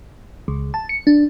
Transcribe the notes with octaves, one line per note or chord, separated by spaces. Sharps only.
C#2
A5
C#7
D4